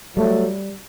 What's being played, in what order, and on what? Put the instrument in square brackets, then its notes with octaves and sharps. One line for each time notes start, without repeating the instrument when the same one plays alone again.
[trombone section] F#3 A3 [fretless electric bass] G3